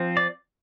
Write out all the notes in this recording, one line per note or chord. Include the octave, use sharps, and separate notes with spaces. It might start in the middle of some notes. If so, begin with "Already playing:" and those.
Already playing: F3 C4
D5